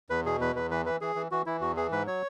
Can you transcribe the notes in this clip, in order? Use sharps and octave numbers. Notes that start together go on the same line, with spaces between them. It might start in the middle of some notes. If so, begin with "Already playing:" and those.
E2 B4
B2 G#4
E2 B4
E2 B4
E3 B4
E3 B4
E3 G#4
E3
E3 F#4
E3 E4
E2 F#4
E3 G#4
G#2 B4
F#3 C#5